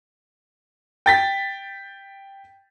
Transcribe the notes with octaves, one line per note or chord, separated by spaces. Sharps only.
G5 A6 B6